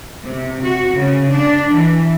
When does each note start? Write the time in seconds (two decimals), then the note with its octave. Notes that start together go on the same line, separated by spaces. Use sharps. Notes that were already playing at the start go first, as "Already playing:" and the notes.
0.24 C3
0.63 F#4
0.95 C#3
1.32 D4
1.72 E3